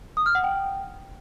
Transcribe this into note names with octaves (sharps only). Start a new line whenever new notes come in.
D#6
F6
F#5
G5